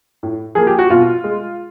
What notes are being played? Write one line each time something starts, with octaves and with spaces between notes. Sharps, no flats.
A2
F3 A#3 G#4
G4
F#4
B2 F4
G#3